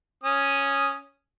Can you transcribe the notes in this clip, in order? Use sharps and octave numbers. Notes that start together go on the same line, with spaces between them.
C#4 D#6